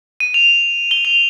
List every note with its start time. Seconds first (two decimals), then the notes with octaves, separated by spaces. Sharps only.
0.20 D#7
0.34 F7
0.91 G7
1.05 F7